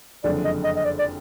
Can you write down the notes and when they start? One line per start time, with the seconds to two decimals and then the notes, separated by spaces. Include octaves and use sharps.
0.24 F#1 F2 D3 G#3 D5
0.45 D#5
0.64 D#5
0.76 D#5
0.84 D5
0.99 D5